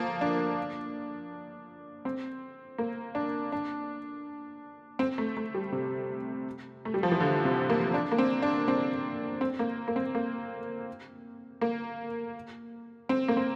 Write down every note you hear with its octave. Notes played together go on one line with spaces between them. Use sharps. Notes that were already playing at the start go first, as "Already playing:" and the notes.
Already playing: F3 A#3
D4
C4
A#3
D4
D4
C4
A3
A3
G3
C3
A3
G3
F3
E3
D3
C3
A#3
D4
A#3
C4
D4
C4
C4
A#3
A#3
C4
A#3
A#3
C4
A#3
C4